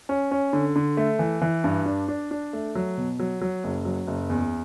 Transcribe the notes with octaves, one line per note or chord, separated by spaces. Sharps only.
C#4
C#4
D3
D3
A3
E3
E3
G2
D4
D4
D4
A3
F#3
B2
F#3
F#3
F#1
F#3
F#1
E2